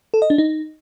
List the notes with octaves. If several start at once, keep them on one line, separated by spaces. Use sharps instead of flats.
A4
D#5
D4
D#4